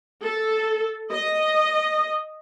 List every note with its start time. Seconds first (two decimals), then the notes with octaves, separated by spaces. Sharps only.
0.24 A4
1.12 D#5